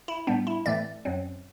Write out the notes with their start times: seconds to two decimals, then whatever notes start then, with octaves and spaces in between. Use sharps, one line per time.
0.08 E4
0.27 A2 G3 B3 D4
0.47 E4
0.66 A2 E3 A3 C4 D5
1.05 F#2 F#3 C4